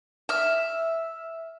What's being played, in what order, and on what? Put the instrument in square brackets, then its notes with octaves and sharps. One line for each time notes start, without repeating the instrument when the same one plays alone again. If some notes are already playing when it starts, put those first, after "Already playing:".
[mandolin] E5 F6